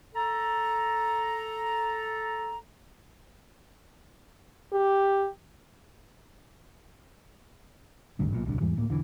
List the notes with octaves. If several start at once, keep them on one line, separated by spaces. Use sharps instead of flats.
A4 A#5
G4
G#1 D2 G2
B1 A#2
D1 C2 D3
E2 G#2 E3 G3
D1 A2 A#3
E1 D3 E3